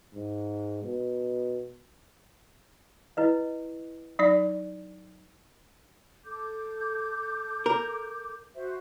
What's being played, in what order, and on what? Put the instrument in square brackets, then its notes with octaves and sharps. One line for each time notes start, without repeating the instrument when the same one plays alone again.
[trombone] G#2
B2
[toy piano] E4 B4 D#5
[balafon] F#3 D#4 D5
[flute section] A4 D6 G6
[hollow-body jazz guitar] A#4
[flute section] F#4 C5 E5